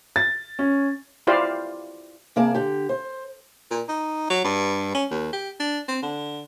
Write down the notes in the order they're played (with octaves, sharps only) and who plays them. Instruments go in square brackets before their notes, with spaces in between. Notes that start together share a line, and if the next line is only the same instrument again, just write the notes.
[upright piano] A6
C#4
[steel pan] E4 F4 G4 C5 D5 F5
[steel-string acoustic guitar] C3 A#3 G#4 D5 A5
D3 G4
C5
[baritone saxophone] A#2
D#4
F#3
G2
C#4
D#2
G4
D4
C4
D3